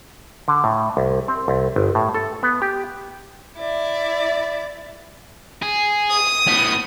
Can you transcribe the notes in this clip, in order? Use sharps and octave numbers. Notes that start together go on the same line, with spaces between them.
D3
A2
C2
C4
C2
G1
A2
A4
B3
G4
E4 D5
G#4
D#6
A2 B3